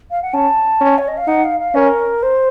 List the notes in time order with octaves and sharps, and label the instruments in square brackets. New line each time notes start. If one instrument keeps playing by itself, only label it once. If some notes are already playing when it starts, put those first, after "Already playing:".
[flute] F5
F#5
[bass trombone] C#4 [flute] A5
[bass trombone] C#4
[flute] C#5
D#5
F5
[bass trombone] D#4 [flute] F#5
[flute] F5
F5
[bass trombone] C#4 [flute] A#4
[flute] C5